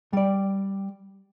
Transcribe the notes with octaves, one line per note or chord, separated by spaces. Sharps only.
G3 D5